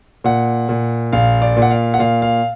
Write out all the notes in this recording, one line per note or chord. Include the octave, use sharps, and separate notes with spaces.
A#2 F#5
A#2
A#1 F5
D5
A#2
F#5
F5
F#5
A#2 F5
F5